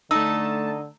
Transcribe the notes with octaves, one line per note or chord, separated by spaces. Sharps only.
D3 A3 D#4 A5 E6